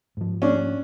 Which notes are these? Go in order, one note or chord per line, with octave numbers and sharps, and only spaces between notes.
G#2 F3
C#4 D4